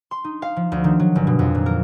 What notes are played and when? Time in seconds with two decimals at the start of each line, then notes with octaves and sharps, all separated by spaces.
0.11 C6
0.24 D#4
0.42 F5
0.57 F3
0.72 D2
0.84 D#3
1.00 F#3
1.16 G1
1.27 B2
1.39 F2
1.55 A#2
1.66 A#4